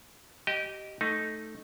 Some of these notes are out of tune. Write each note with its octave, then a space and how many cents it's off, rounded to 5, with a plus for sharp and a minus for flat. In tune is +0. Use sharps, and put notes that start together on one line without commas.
G4 -20 D#5 +0
A3 +0 D#4 +0